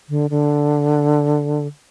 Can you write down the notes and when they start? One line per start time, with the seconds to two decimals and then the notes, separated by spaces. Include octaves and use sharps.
0.09 D3
0.30 D3